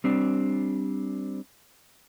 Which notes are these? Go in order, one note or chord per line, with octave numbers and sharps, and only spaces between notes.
G3 C4 D4